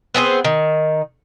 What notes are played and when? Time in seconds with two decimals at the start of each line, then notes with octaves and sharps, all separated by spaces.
0.14 B3 C4 G#4 C5
0.44 D#3